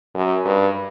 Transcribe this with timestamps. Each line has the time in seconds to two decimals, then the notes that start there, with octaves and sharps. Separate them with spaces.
0.14 F#2
0.46 G2